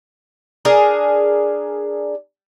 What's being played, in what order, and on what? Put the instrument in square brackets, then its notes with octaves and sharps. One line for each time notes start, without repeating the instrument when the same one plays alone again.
[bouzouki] D4 G#4 A#4